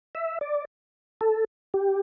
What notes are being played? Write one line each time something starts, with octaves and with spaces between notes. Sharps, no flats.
E5
D5
A4
G4